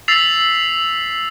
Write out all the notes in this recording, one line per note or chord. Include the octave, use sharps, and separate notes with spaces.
E6 A6 B6 C7 F7